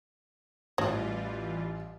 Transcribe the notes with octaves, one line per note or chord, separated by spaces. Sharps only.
A1 E3 F#3 G3 F4